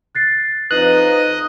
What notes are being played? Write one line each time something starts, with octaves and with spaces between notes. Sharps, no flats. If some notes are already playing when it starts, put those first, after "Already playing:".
F#6 A6 C7
F2 D#4 B4 D#5 F#6